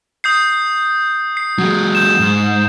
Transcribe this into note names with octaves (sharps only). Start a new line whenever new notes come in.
D#6 G6 C7
C7
F#3 G#3
G6 E7
G#2